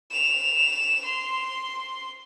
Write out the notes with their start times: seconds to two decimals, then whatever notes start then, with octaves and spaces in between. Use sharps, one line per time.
0.10 E7 F7
1.04 C6